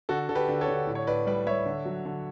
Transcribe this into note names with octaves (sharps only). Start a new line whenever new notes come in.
D3 F#4 A4
D3 A4
G4 B4
D3
A4 C#5
D3
A2
C#5
A2 B4 D5
G3 B4 D5
G3 C#5 E5
D3
F#3
D3